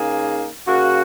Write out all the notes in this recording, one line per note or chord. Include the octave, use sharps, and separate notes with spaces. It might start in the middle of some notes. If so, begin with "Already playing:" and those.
Already playing: C#3 A#3 D#4 G#4
C#3 A#3 F#4